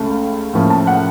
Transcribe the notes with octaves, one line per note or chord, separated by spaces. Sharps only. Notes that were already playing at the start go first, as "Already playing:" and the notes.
Already playing: C#2 C#3 A3 C#4 A5
A2 F3 A#3 C#4
A5
F#5